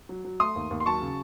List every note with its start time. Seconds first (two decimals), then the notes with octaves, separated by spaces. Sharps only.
0.09 F#3
0.25 F#3
0.40 A3 C6 D#6
0.55 D#2
0.71 D#2
0.80 C6
0.86 F#3 A5 C#6
1.01 C#3